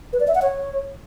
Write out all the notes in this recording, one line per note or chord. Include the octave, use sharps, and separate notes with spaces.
B4
D5
E5
F#5
C#5